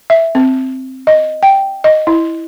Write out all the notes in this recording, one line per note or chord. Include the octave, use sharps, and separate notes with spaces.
E5
C4
D#5
G5
D#5
E4